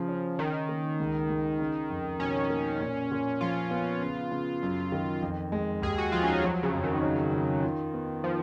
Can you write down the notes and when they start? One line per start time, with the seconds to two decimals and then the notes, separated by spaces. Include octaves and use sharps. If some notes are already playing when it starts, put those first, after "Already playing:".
Already playing: C#3 F3
0.09 C#4
0.39 D#3 D#4
0.69 A#3
1.00 C#2
1.29 C#2
1.59 C#3
1.90 F2
2.20 B2 C#4
2.50 A#3
2.80 A#2
3.11 A#2
3.41 F3 F4
3.71 B3
4.02 C#3
4.31 C#3
4.62 F#2
4.92 D#3
5.22 F2
5.52 G#3
5.82 D#2 G#4
5.98 F#4
6.12 F3 F4
6.23 C#4
6.28 D#4
6.43 F3 F#3
6.63 C#3
6.74 F2
6.84 D#3
7.03 C#4
7.33 C#4
7.63 F4
7.94 B3
8.24 F3